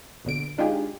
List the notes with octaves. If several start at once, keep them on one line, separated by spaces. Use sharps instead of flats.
A#1 B2 D3 D7
G#3 D4 D#4 F4 G4 G#4